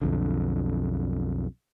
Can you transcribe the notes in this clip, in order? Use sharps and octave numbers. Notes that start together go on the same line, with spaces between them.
B1 F2 D3